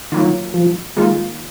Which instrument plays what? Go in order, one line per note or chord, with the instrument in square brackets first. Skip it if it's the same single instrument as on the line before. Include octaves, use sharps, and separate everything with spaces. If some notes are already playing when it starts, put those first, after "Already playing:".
[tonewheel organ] D#3 [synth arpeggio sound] F#3 A#3 F4
[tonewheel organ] F3
[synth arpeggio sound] D#3 A#3 F4 [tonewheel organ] G#3